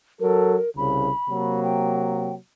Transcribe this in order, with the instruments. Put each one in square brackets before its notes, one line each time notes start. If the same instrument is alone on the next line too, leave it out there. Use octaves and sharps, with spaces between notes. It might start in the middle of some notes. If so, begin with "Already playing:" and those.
[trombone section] F#3 A4 [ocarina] A#4
[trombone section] C2 C#3 [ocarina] B5
[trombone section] C3 F#3 A#3
[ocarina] G5